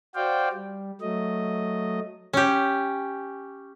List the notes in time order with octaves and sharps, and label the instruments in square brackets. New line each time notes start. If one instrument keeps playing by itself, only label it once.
[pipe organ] F#4 C5 D5 F5 G5
G3
F#3 A3 D#5
[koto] C#4 G4